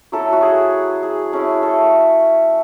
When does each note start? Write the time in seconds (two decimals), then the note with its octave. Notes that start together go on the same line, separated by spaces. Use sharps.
0.12 F#3 C#4 E4 A4
0.32 F#4
0.42 G#4
1.03 G#4
1.33 A3 C#4 E4
1.63 A4